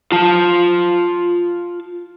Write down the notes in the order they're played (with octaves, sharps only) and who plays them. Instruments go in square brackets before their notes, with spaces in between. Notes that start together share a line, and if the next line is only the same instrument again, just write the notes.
[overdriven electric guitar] F4 A5